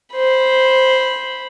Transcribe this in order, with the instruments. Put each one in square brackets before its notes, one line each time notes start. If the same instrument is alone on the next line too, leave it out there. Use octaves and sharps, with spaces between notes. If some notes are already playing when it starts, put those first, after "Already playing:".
[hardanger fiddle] C5 B5